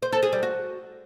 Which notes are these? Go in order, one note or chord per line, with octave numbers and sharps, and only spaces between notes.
C5
A4
G#4
G3
F#4